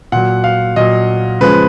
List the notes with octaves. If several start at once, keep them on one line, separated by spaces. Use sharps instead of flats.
A#2 F#3 F#5
F5
A#2 F#3 D#5
C#3 F3 G#3 B4